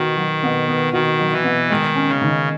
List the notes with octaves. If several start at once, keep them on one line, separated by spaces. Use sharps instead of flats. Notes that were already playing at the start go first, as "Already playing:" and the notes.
Already playing: B2 D#3 B3 F#4
F#3
B2
B3
D#3 F#4
F#3
E3
B2
D#3 G#3
C#4
C#3
D#3